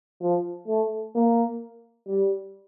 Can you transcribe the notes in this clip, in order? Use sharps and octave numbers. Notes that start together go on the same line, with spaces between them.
F3
A3
A#3
G3